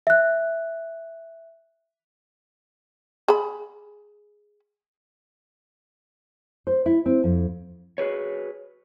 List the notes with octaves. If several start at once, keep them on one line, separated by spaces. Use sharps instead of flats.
E5 F#6
G#4 B5
C5
E4
C4
F2
F#4 G#4 B4 C#5